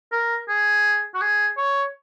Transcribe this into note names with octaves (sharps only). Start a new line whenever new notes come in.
A#4
G#4
F#4
G#4
C#5